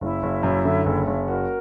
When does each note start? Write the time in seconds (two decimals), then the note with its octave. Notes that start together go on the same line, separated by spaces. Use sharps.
0.01 F#1 E4 E5
0.22 F#1
0.43 F#2
0.65 D3
0.86 F#1
1.07 F#1
1.28 F#4 A#4